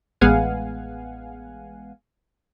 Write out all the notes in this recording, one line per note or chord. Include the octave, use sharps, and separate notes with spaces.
A1 G#3 B3 F5 F#5 G#5